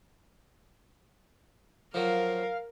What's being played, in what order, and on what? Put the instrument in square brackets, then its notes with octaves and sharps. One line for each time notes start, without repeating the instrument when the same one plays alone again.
[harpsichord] F3 F#3 [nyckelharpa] A#4 [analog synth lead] F5